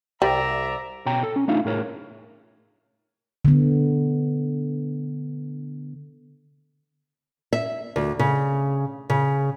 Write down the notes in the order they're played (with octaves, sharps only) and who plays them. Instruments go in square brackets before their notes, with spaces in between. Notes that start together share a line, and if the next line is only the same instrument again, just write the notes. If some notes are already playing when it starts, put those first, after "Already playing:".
[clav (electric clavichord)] C2 [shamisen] G3 [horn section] D5 E5 A#5
[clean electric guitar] B2 C#5 G5 A#5
A4
C#4
A3 D4 D#4 F4 E5 F5
A2 G#4 A#4 C#5
[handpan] D3 B3
[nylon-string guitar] E5
D2
C#3
C#3